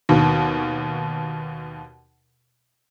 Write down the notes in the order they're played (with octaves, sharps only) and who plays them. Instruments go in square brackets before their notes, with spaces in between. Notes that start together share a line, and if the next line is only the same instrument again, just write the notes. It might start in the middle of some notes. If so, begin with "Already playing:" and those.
[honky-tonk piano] D#2 B2